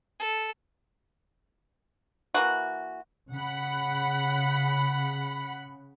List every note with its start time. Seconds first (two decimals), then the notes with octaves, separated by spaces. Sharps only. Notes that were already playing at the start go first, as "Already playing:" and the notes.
0.19 A4
2.34 E3 A#3 F#4
3.33 C#3 F#5 B5